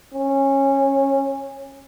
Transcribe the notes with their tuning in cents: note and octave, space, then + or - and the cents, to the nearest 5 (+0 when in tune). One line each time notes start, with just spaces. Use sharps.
C#4 -20